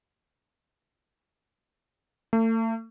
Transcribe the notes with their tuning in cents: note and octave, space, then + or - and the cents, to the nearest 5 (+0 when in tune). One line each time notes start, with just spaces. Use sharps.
A3 +40